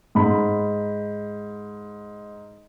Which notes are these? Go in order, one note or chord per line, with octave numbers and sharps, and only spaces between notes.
G#2 B5